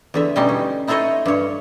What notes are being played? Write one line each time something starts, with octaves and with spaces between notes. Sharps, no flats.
E2 D3 E5
B2 G3 C#4 D#4 C6
C#4
D#4 E4 A4 C5 C#5 D#5
G2 C#5